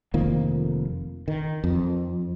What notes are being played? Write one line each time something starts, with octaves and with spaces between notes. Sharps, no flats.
F1 D#3 F3 A#3
D#3
F2